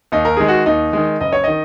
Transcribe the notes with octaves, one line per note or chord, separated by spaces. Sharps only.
D#2 D#4
A#4
D#3 G#3 G#4
F#4
D#2 D#4
D#3 G#3
F#1 D#5
C#5
D#3 D#5